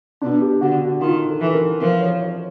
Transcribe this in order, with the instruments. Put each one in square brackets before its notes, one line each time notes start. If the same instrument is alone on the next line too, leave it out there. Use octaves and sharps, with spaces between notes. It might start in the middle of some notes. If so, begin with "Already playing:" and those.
[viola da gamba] B2 [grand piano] D4
[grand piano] G4
[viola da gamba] D3 [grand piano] F#4
[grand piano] F#4
[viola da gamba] D#3 [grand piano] F4
[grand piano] A4
[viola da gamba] E3
[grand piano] A#4
[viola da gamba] F3 [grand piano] A#4
[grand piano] C#5
C#5